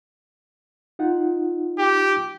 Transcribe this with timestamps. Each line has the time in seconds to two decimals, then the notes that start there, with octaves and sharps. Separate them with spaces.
0.99 D#4 F4 F#5
1.79 G4